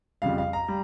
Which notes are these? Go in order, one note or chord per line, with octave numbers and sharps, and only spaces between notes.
F2 C#3 G3 F5
F5
A#5
G3